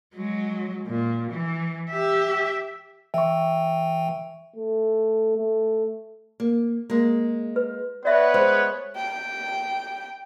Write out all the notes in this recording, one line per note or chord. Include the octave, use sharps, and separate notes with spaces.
F#3 G#3
A#2
E3
G4 E5
E3 E5 G5 C#6
A3
A3
A#3
G#3 A#3
B4
B3 B4 C#5 D5 E5
G#3 C5
G5